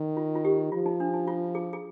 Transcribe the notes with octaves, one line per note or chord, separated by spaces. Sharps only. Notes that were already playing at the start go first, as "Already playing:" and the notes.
Already playing: D#3
F4
F4
G4
F3 F4
D#4
D4
D#4
F4
G#4
G#4